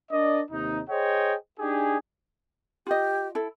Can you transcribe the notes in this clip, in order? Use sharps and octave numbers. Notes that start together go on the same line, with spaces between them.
D4 A#4 D5 D#5
D#2 C3 D#4
G#4 C5 C#5 D#5 G5
D4 D#4 G4 G#4
F4 G4 D#5
E4 A4